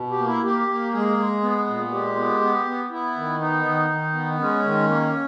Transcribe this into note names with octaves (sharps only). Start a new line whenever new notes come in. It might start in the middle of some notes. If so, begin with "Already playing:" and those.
Already playing: B2
G4
A#3
E4
A#3 G4
A#3
G#3 G#4
G#3
B3
A#2
G#3 G4
B3
B3
B3
B3 E4
D#3
B3 D#4
D#3
D#3
B3
G#3 C#4
D#3
A#3